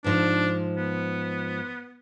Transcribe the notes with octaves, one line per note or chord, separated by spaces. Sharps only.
G#2 F3 D4
B3